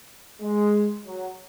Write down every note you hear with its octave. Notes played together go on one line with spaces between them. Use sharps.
G#3
F#3